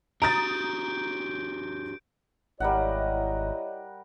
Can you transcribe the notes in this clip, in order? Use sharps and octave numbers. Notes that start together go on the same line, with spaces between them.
D4 F#4 G4 A#5 D#6 G6 A6 D7
G#1 G3 E4 A#4 C#5 D#5 F#5